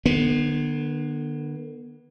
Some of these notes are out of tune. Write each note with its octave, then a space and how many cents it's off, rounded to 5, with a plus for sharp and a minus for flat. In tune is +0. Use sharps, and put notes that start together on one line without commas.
D3 +35 B3 -25